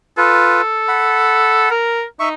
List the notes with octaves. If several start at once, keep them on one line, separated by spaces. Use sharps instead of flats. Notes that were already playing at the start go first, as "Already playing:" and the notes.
F4 A4 B4
F#5 B5
A#4
D#4 E5 C#6